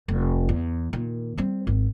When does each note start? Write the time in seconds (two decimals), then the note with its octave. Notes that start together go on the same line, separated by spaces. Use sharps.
0.08 F1
0.49 E2
0.93 A#2 D#3
1.37 G3 C4
1.67 G#1 C4